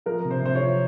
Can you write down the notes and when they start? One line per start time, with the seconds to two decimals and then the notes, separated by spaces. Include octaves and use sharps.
0.06 F3 A#4
0.25 C3
0.31 C5
0.42 C3 C5
0.55 C#5
0.61 F3